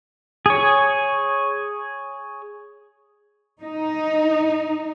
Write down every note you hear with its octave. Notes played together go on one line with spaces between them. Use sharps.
G#4 C#5
D#4